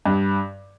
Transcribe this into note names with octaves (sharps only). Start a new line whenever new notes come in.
G2